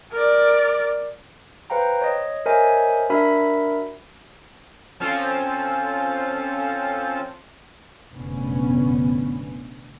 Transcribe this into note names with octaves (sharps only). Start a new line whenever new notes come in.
A#4 D5
B4 C5 F5 G5 A#5
C#5 D#5
A#4 C5 C#5 D#5 E5 G#5
D4 F#4 A#4 E5 B5
F3 C4 C#4 F4 A4 C5
F1 A#1 F#2 D3 B3 C#4